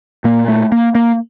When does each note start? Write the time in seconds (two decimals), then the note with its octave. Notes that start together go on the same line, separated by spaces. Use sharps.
0.24 A#2 A#3
0.48 A3
0.72 A#3
0.95 A#3